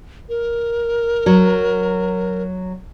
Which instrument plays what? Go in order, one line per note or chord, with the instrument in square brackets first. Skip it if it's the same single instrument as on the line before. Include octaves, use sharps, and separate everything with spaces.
[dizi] A#4
[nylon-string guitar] F#3